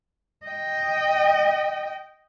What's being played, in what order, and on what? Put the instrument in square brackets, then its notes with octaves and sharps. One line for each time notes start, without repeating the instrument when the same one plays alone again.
[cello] D#5 G5